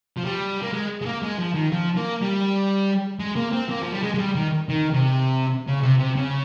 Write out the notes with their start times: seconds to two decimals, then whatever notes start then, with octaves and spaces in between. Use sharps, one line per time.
0.17 F3
0.24 G3
0.62 A#3
0.73 G#3
1.02 G#3
1.05 A#3
1.23 G#3
1.39 F3
1.55 D#3
1.71 F3
1.97 A#3
2.22 G3
3.19 G#3
3.36 A#3
3.52 C4
3.70 A#3
3.82 F3
3.92 G3
4.03 G#3
4.14 G#3
4.18 G3
4.35 D#3
4.69 D#3
4.93 C3
5.68 C#3
5.83 C3
6.00 C3
6.17 C#3